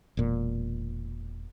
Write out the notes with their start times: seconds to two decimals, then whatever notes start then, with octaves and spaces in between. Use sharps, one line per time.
0.17 E1 A#2